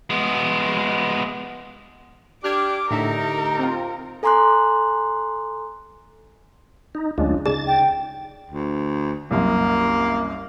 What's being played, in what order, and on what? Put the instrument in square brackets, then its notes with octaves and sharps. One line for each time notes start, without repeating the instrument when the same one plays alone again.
[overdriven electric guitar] G#3 B3
[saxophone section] D4 G4 [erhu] D6 [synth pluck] F6 G#6
[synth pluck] A2 D3 E5 [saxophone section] D#4 G4 [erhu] A#4
[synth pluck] C4 F4
[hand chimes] A4 G#5 A#5 C6 D6 F#6
[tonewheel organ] D#4
[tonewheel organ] D2 G#3 D4 [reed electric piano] F#3 C#4 F4
[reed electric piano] C#3 D#4 D5 [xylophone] G#4 [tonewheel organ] A6
[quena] G5
[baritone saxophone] D2
[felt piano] C2 F#2 [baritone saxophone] A#3